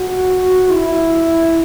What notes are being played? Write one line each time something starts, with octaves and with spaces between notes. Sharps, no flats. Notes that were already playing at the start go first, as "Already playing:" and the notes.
Already playing: F#4
E4